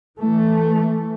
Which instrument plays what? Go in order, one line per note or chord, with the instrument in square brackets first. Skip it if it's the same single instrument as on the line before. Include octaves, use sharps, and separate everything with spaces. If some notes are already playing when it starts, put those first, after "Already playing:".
[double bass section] E3 A3